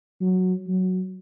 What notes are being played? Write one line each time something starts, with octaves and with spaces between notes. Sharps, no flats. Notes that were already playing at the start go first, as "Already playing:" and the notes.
F#3
F#3